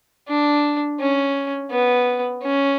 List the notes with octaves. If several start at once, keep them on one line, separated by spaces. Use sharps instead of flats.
D4
C#4
B3
C#4